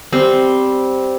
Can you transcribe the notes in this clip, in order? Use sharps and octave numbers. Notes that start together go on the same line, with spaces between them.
G3 C4